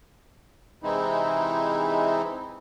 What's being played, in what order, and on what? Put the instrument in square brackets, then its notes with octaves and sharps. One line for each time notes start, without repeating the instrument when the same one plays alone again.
[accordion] C3 E3 G#3 C4 D#4 E4